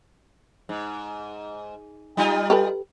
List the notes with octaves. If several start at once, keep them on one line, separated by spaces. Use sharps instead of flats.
G#2
G3 D#4 F4
G4 A4 B4